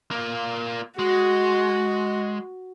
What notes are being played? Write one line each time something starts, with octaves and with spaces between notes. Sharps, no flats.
A#3 F4
G#3 F#4